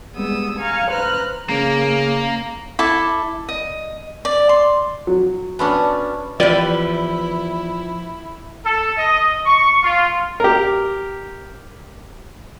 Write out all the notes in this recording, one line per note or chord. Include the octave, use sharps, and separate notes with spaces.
G3 G#3 B3 D#6 E6
F5 G#5 A#5 C#6
B4 C5 A#5 F6 F#6
C#3 A#3
E4 A4 A5 D6
D#5
D5
C6
F#3
B3 C#4 D4 A5 B5 F6
E2 F3 E4 G4 B4 D5
A4
D#5
C#6
F4
G4 A#4